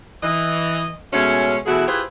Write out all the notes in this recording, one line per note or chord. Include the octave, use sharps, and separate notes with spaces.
E3 D#5
B2 G#3 A3 C#4
B2 E3 A3 E4 F#4 G#4
E4 F4 G4 G#4 B4 C5